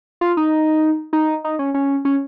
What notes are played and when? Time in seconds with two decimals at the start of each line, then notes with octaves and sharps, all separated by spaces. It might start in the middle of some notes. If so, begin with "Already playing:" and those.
0.21 F4
0.37 D#4
1.13 D#4
1.44 D#4
1.59 C#4
1.74 C#4
2.05 C#4